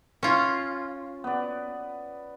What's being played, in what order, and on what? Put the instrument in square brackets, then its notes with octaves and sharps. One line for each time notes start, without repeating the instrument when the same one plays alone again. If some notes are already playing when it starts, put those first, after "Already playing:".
[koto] C#4 F4
[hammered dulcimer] B3 D5